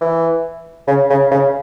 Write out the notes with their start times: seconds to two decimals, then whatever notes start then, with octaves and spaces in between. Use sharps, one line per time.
0.01 E3
0.87 C#3
1.10 C#3
1.31 C#3